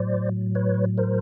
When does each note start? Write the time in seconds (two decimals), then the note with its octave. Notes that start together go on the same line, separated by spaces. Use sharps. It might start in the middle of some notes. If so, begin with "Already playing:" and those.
Already playing: A2 F#3 C5 D5
0.55 B4 C#5
0.97 A#4 C5